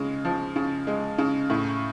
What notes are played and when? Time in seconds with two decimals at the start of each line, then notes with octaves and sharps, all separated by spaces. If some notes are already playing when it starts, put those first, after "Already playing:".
Already playing: C#3 G#3
0.25 F3
0.56 C#3
0.87 G#3
1.18 C#3
1.50 A2